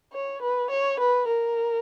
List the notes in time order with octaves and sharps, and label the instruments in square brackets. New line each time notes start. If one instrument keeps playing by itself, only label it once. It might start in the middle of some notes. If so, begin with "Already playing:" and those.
[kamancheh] C#5
B4
C#5
B4
A#4